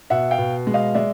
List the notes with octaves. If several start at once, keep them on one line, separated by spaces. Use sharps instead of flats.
B2 E5 F#5
F5 G5
B2
G#3
D#5 F5
G#3 D5 E5